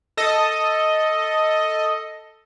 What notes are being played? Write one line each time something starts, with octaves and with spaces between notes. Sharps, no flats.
A4 D#5